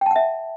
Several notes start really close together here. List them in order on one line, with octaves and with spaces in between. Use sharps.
G5 A5 F#5 E5